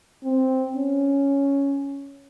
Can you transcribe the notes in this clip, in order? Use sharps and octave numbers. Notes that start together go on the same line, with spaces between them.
C4
C#4